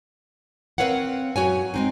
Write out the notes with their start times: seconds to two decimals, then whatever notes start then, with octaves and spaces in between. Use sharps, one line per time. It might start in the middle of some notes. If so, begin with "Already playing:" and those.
0.78 C4 A#4 B4 C#5 F5 F#5
1.36 F#2 F#4 C#5 G#5
1.74 G#3 C4 D#4